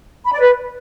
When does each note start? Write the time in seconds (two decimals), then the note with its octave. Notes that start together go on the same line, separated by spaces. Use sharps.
0.24 B5
0.32 D5
0.39 B4